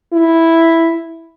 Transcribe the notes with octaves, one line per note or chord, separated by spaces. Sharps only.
E4